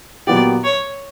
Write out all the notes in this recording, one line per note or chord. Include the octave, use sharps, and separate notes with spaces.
A#2 F#3 B3 E4 G4 D5
C#5